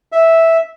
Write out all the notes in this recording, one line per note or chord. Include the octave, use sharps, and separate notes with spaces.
E5